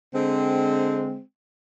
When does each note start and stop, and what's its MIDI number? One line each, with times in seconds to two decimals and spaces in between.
0.14 1.20 50
0.14 1.20 56
0.14 1.20 60